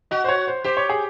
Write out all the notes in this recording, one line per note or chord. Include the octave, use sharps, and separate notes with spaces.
F#4 D#5
C5
C#5
C5
G4 C5
C#5
G#4